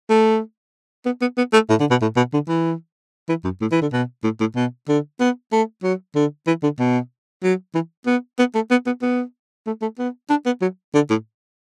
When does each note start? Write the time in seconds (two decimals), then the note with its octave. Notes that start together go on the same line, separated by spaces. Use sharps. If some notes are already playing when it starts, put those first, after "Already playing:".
0.10 A3
1.06 B3
1.21 B3
1.37 B3
1.53 A3
1.70 A2
1.80 D3
1.91 B2
2.02 A2
2.16 B2
2.34 D3
2.48 E3
3.29 E3
3.44 F#2
3.61 A2
3.72 E3
3.82 D3
3.93 B2
4.24 A2
4.40 A2
4.56 B2
4.88 D3
5.20 B3
5.52 A3
5.84 F#3
6.15 D3
6.47 E3
6.63 D3
6.79 B2
7.43 F#3
7.75 E3
8.06 B3
8.39 B3
8.55 A3
8.71 B3
8.86 B3
9.02 B3
9.66 A3
9.82 A3
9.99 B3
10.30 D4
10.46 B3
10.62 F#3
10.95 D3
11.10 A2